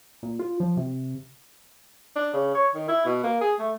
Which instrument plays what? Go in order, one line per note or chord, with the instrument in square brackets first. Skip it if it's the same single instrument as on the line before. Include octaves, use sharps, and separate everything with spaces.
[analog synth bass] A#2
F4
F3
C3
[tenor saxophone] D4
C#3
C#5
D#3
E4
B2
A#3
G#4
A3